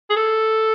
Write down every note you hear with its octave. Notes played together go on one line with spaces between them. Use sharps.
G#4
A4